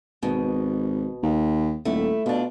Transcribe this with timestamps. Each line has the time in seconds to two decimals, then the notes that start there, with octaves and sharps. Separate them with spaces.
0.23 G#1 B2
1.23 D#2
1.85 D#1 A3 E4
2.26 B2 D4 F4